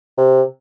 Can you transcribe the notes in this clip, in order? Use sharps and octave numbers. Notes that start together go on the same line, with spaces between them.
C3